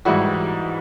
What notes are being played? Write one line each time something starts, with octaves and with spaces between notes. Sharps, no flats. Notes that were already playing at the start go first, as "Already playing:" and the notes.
G#2 E3 G3 E4 F#4